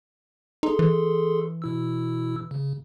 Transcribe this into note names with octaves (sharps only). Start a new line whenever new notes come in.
D#4 G#4 A4 C6
E3
B2 E4 E6
C#3